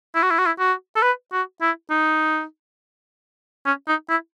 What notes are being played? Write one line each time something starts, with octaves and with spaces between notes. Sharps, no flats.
E4
F#4
E4
F#4
E4
F#4
A4
B4
F#4
E4
D#4
C#4
D#4
E4